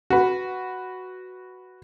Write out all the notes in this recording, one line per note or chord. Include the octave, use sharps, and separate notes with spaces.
F#4 B4